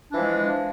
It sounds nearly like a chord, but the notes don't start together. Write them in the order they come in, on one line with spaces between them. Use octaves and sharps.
D4 E3 F3 G#3